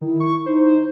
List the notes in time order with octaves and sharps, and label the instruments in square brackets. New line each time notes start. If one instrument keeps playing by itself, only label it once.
[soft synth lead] D#3 [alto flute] E4
[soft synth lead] C#6
[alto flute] D#4 [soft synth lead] C5